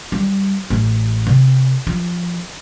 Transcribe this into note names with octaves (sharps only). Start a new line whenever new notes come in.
G3
A1
C3
F3